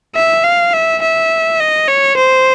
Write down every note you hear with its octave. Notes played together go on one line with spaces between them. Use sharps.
E5
F5
E5
E5
D#5
C#5
C5